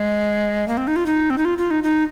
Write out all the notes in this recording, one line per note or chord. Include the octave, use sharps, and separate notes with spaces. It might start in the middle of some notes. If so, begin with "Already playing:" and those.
Already playing: G#3
A#3
C4
D#4
F4
D#4
C4
D#4
F4
F4
D#4
D#4